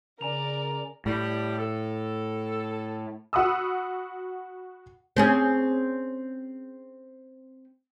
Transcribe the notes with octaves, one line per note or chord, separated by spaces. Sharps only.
C#3 A#4 D5 G#5 A#5 F7
A2 G3 G4
A4
F#4 F#5 B5 D#6 E6
C4 C#4 G#4